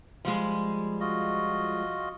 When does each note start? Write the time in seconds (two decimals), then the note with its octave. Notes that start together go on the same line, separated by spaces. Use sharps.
0.25 F3 G3 G#3
1.00 F4 F#4 D#5